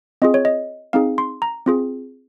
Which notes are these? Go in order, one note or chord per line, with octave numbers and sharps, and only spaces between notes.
C4 F4 G#4 D#5
C#5
D#5
C4 D#4 G#4 F5
C6
A#5
C4 F4 G#4